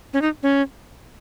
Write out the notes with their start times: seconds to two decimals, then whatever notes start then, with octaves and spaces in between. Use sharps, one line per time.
0.13 C#4
0.22 D#4
0.43 C#4